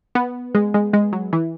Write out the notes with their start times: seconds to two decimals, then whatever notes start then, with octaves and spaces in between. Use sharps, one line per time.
0.15 B3
0.55 G#3
0.74 G#3
0.93 G#3
1.13 F#3
1.33 E3